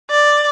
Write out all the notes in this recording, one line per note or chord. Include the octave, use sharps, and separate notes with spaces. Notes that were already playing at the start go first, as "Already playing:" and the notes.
D5